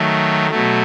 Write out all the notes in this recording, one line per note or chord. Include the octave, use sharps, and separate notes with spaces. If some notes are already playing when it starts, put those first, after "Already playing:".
Already playing: D#3 F#3 A3
B2 F#3 A3